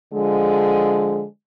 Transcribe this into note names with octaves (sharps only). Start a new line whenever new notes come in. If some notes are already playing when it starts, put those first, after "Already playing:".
D3 F3 G#3